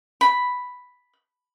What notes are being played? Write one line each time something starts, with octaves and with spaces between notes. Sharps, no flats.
B5